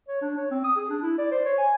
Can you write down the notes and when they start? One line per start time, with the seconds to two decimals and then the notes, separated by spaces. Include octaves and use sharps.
0.08 C#5
0.21 D4
0.37 C#5
0.51 C4
0.64 D#6
0.76 G#4
0.90 D4
1.03 E4
1.18 D5
1.31 C5
1.45 C#5
1.58 G#5